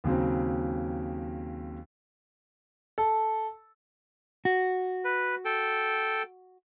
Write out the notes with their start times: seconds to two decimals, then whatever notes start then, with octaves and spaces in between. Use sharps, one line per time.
0.04 D#2 C#3 F#3 C4
2.98 A4
4.45 F#4
5.05 B4
5.45 A4 G5